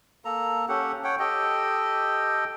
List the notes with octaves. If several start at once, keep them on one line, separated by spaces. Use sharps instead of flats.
A#3 A4 A#5
C#4 G4 A4 F#5
C#5 F#5 G5
G4 A4 D#5 G5